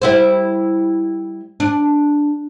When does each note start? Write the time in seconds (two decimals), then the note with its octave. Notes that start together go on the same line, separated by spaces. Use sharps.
0.02 G3 E4 C5
1.60 D4